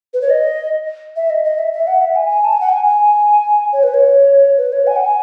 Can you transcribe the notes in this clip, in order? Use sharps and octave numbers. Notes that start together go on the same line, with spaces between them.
B4
C#5
D#5
E5
D#5
D#5
E5
E5
F#5
E5
G#5
G#5
A5
G#5
F#5
G#5
G#5
C#5
B4
C#5
B4
C#5
G#5
F#5
G#5